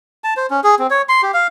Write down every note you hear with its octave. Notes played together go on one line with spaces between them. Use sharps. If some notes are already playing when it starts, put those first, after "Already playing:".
A5
C5
C#4
G#4
C4
C#5
C6
G4
F5